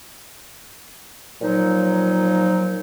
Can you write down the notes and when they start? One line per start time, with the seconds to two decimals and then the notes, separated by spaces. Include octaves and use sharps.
1.42 A#2 F3 F#3 D#4